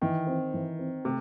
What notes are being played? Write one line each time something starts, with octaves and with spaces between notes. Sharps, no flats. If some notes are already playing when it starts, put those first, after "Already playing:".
D#3 E3
C4
E3
C4
C3 A3